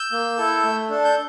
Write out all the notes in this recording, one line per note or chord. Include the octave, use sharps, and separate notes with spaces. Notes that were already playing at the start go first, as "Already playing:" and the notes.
Already playing: E6 G6
A#3
E4 A4
A3
D4 A4
G6